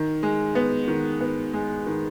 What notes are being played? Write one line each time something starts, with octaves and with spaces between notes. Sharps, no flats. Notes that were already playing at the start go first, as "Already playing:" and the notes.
Already playing: D#3
G#3
B3
D#3
B3
G#3
D#3